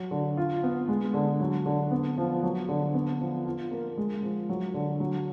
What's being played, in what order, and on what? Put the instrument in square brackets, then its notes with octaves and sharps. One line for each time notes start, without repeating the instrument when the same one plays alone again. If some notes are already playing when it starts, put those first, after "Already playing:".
Already playing: [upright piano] F#3
D3
F4
B3
G#3
D3
F#3
D3
B3
F3
F#3
D3
B3
F3
F4
A#3
G#3
F3
F#3
D3
F#3